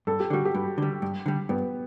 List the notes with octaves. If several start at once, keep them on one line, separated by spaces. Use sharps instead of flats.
G2 A4
G4
D3 G3 F#4
G4
G2
D3 G3
G2
D3 G3
G2 B3